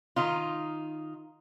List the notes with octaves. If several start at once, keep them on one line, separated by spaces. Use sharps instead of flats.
D#3 D#4 F4